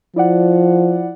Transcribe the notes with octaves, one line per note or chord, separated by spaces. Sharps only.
F3 E4 D5 F#5